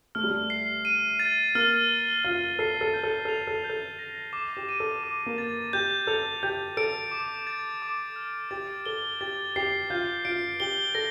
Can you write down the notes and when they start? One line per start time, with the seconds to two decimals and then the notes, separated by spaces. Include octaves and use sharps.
0.15 A3 F6
0.24 G3
0.31 A3
0.50 C7
0.85 D#7
1.19 A6
1.55 A#3 F6
1.89 G7
2.24 F4 F6
2.59 A4 C7
2.81 A4
2.94 G6
3.03 A4
3.25 A4 F7
3.47 A4
3.64 G6
3.70 A4
3.99 A#6
4.33 D6
4.57 G4
4.69 D#7
4.80 A4
5.03 D6
5.26 A#3
5.38 A6
5.73 G4 G6
6.07 A4 F7
6.43 G4 G6
6.77 A4 D7
7.11 D6
7.47 A6
7.82 D6
8.16 F6
8.51 G4 A6
8.86 A4 G7
9.21 G4 A6
9.56 G4 C7
9.90 F4 G6
10.25 F4 D7
10.60 G4 G7
10.95 A4 A#6